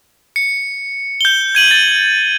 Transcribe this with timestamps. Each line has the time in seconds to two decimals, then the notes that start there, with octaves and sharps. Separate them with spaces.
0.36 C#7
1.21 G6 G7
1.55 G#6 D#7 F#7
1.71 A6